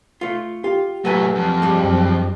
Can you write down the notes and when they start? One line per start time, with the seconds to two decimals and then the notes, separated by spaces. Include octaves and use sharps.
0.21 A3 F4
0.64 F4 G4
1.05 A#2 F#3 A3 B4 G#5
1.35 F2
1.62 G2 G3 G#3
1.84 F#2 F#3